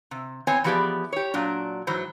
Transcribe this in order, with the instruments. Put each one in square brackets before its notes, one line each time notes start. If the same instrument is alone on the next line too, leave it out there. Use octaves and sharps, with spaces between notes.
[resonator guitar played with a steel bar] C3
E2 B3 C4 C#5 G#5
E3 F3 B3 G4 G#4 D5
G4 C#5
A#2 F#3 D4
G#2 E3 F#3 C5